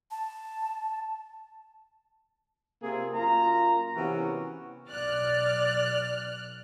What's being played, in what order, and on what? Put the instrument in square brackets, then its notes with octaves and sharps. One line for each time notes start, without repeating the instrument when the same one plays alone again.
[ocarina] A5
[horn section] C3 A#3 C4 F4 G#4
F#2 A#3 F4 A#5
C3 E3 B3 C#4 F#4 A#4
[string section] B1 F6 F#6 [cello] D5